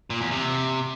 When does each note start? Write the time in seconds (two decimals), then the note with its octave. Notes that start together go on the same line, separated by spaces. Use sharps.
0.10 A#2
0.21 E2
0.31 C3